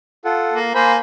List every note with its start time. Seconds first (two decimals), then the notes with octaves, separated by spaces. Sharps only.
0.25 F4 A4 F#5
0.54 A#3
0.75 A#3 C5 G#5 B5